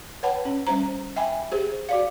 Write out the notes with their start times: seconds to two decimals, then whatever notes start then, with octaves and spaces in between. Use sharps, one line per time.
0.23 B4 C#5 F#5 G5 A5 B5
0.45 C#4
0.67 G3 C#4 C5 A#5
1.16 E5 G5 G#5 B5
1.52 G4 G#4 C5
1.89 F#4 D5 F5